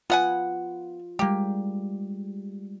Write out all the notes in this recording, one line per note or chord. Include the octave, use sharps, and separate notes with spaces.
B3 F4 F#5 G#5
G3 G#3 A#3 G4